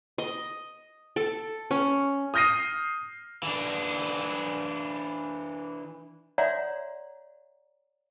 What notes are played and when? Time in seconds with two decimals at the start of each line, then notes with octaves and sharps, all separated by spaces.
0.18 D#5
1.16 A4
1.71 C#4
2.34 D#6 F6 G6 A#6 C7 D#7
3.43 E3 D4
6.38 C#5 D5 E5 F#5 A#5 C6